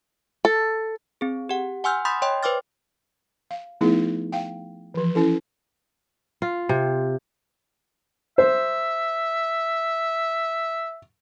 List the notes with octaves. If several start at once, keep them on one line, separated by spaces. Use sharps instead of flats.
A4
C4 G#4
G4 F#5
F#5 G#5 C6 E6 F6 G6
B5 C6 D#6 G6 A6 B6
C#5 D#5 G5 C6
B4 C5 G5 D6 F6 A6
F5
F3 A3 B3 D#4 E4 G#4
F5 G5
E3 F3
C#4 E4 A4
F4
C3
C5 E5